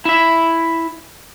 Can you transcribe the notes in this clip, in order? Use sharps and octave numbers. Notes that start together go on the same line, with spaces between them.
E4 E5